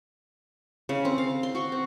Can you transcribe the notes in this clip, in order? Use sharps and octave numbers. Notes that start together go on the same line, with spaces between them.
C#3
C4
F5
C6
F#4
C4